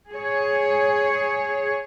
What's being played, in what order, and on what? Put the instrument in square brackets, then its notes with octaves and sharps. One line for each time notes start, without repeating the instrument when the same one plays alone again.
[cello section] G#4 C#5